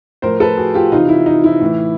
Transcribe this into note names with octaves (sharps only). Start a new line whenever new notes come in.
A2 F3 A#4 C5
A4 B4
F#4 G#4
F4 G4
C3 E3 D#4 F4
E4
D#4
E4
A2 E3